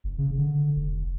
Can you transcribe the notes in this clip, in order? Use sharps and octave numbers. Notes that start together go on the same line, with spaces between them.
F#1
C#3
D3
F1